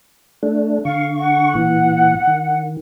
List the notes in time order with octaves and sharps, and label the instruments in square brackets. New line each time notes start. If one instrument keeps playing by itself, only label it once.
[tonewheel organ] A3 D4
[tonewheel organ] D3 C#6 [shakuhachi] F5
[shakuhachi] F#5
[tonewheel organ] A#2 E3
D#3